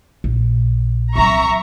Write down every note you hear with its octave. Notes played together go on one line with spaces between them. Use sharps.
A#1
C2 F#3 E5 A#5 C#6